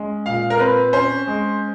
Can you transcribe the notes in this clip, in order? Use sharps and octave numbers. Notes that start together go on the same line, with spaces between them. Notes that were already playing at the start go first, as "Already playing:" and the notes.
Already playing: G#3 C#4
A#2 F5
A#4
C4 B4
C#4 C5
G#3